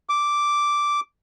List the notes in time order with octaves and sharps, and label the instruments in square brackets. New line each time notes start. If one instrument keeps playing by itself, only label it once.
[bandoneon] D6